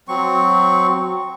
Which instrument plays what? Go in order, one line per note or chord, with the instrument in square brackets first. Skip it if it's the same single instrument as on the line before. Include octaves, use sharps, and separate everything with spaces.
[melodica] F#3 C4 C#6